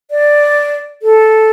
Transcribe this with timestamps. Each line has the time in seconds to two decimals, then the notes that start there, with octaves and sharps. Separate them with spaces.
0.11 D5
1.03 A4